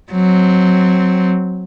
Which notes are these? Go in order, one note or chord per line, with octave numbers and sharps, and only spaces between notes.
F#3 C4